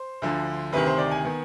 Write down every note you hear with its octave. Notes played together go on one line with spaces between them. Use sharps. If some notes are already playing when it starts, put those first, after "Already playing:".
Already playing: C5
D2 D3 F3
D2 C3 D#3 B4
C5
D5
G#5
D#3 B3